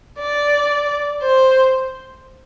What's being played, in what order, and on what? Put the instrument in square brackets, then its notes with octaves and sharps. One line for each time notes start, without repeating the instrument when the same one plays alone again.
[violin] D5
C5